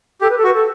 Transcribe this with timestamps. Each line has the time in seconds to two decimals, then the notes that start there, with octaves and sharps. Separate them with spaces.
0.21 G4 A4
0.30 B4
0.37 A4
0.44 F#4 B4
0.54 A4